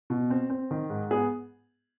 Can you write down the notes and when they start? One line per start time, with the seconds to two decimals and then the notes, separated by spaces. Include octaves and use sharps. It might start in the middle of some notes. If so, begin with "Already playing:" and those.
0.10 B2
0.30 C4
0.50 C4
0.71 D#3
0.90 G#2
1.11 B3 G#4